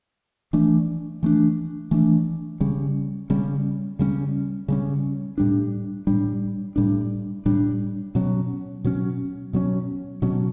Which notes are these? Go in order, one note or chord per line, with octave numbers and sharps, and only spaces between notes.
E3 A3 D4
E3 A3 D4
E3 A3 D4
C#3 G3 C#4
C#3 G3 C#4
C#3 G3 C#4
C#3 G3 C#4
A2 G3 D4
A2 G3 D4
A2 G3 D4
A2 G3 D4
B2 F#3 C#4
B2 F#3 C#4
B2 F#3 C#4
B2 F#3 C#4